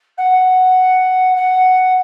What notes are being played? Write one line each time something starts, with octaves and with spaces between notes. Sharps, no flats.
F#5
F#5